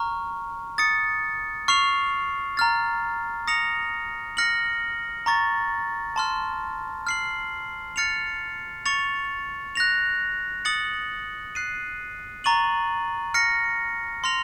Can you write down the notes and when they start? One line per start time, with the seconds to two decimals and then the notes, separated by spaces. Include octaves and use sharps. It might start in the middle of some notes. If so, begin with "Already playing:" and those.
Already playing: A#5 C#6 F6
0.78 D#6 A6 C#7
1.68 C#6 F6 C7 F7
2.57 A#5 F6 A6
3.47 D#6 A#6 C#7 F7
4.37 F6 A#6 C#7 F#7
5.26 A#5 C#6 A6
6.16 A5 C6 F6
7.07 F6 C7 F#7
7.96 F6 A6 C#7 F7
8.86 C#6 A6 C#7 F7
9.75 F#6 A#6 F7
10.65 D#6 A6 C#7 F#7
11.55 F#6 C7 D#7
12.44 A#5 C#6 A6 D#7 F#7
13.34 F6 A#6 C#7
14.24 C6 F6 A#6 F7